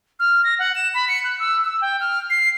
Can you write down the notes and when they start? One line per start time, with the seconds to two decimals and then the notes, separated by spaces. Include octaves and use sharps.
0.20 F6
0.44 A#6
0.59 F#5
0.75 E7
0.94 B5
1.09 C#7
1.24 F#6
1.39 E6
1.64 E6
1.82 G5
2.00 F6
2.30 C7